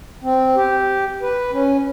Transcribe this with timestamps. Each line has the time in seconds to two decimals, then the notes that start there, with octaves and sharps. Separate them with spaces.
0.23 C4
0.56 G4
1.22 B4
1.53 C#4